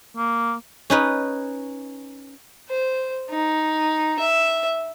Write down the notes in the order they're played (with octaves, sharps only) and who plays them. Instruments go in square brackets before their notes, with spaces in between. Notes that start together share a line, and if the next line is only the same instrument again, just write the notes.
[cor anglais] A#3
[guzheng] C#4 D#4 B4
[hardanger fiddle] C5
D#4
E5